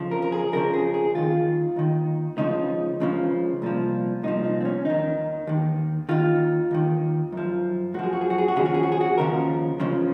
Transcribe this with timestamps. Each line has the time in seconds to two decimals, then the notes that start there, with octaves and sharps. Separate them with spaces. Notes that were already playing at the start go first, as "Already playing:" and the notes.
Already playing: F2 C#3 F3
0.11 A#4
0.22 A#4
0.32 G#4
0.52 F2 C#3 F3 A#4
0.73 G#4
0.94 G#4
1.14 D#2 D#3 F4
1.76 D#2 D#3
2.38 C#2 C#3 F3 D#4
3.00 C#2 C#3 F3
3.62 C2 A#2 F3
4.23 C2 A#2 F3 D#4
4.44 D#4
4.61 C4
4.65 C#4
4.85 D#2 D#3 D#4
5.47 D#2 D#3
6.09 D#2 D#3 F4
6.71 D#2 D#3
7.32 F#2 F3
7.94 F#2 F#4
7.99 F3 G#4
8.13 F#4
8.21 G#4
8.30 F#4
8.38 G#4
8.48 F#4
8.56 D#2 C#3 F3 G#4
8.66 F#4
8.74 G#4
8.83 F#4
8.92 G#4
9.01 F#4
9.18 D#2 C#3 F3 A#4
9.80 C#2 C#3 F3